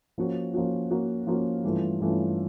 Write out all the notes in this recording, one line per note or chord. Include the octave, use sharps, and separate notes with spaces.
F3 A#3 C#4 F#4
F3 A#3 C#4 F#4
F3 A#3 C#4 F#4
F3 A#3 C#4 F#4
G2 E3 A3 C#4 F4
G2 E3 A3 C#4 F4